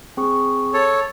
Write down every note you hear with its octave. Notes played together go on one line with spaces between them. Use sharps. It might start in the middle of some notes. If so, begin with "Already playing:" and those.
C4 G#4 C#6
A4 C#5